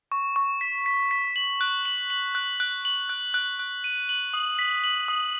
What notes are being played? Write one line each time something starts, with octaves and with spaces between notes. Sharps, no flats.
C#6
C#6
B6
B6
B6
F#7
F#6
F#7
F#7
F#6
F#6
F#7
F#6
F#6
F#6
D#7
F#7
D#6
B6
F#7
D#6